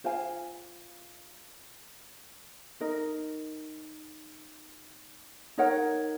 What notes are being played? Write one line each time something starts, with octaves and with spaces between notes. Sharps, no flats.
F4 C5 F5 G#5
D#4 A#4 D#5
D#4 A#4 C#5 F#5